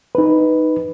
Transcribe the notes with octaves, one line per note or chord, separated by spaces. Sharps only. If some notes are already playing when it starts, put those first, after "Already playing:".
D#4 B4